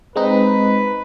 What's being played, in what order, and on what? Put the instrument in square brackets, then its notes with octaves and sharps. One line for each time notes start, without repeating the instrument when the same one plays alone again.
[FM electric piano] G#3 C4 D#4 [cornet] B4